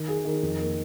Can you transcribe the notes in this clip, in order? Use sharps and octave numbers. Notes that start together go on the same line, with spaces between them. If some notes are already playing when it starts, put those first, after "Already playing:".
Already playing: D#3
G#4
D#3
F2
A#3